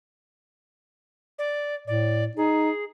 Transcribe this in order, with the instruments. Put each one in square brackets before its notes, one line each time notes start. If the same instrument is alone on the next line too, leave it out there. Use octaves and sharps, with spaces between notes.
[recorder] D5
[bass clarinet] A2 [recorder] D5
[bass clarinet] D#4 [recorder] G#4